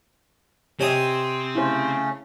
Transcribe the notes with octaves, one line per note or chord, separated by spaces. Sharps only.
C3 C4 G4 C#5 D#5 G#5 D#6
C#3 A3 C#4 E4 C5